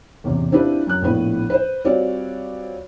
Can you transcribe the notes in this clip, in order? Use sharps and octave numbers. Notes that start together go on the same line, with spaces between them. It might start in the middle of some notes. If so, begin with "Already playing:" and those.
A1 E2 C3
C4 D4 E4 F4 G4 B4
F#2 F#6
A#1 A2 F3 B3 B4
B4 C5
G3 C4 F4 F#4 C#5 D5